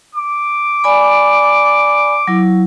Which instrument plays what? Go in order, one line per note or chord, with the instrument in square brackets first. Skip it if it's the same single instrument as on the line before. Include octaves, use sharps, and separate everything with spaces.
[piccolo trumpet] D6
[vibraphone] D5 G#5 B5
F#3 E4